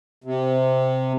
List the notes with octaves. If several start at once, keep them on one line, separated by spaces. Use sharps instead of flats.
C3